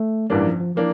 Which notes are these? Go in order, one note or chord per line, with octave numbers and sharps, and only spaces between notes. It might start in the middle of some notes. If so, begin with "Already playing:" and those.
Already playing: A3
A1 G2 E3 G3 A#3 D4
F3
F3
E3 F3 A#3 D4